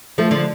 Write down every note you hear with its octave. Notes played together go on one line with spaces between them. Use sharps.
F3 A3
D3 F3